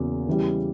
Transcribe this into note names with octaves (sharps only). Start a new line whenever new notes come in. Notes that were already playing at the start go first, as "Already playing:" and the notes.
Already playing: E2 C#3 F#3 A#3
C#3 E3 G3